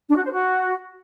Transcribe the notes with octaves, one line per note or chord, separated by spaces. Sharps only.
D4
F#4
C5
F#4